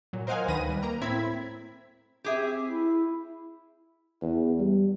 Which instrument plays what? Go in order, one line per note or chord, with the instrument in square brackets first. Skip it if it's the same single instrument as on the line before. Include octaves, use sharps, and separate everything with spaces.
[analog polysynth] A#2 F#3
A#4 C5 D#5 F5 F#5 G#5
D2 D#3 B4 A#6 D#7
G3
A#3 A#5
A2 C4 E4 G#6 B6
[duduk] C4 [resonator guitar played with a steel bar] G4 G#4 E5
[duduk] E4
[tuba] E2
G3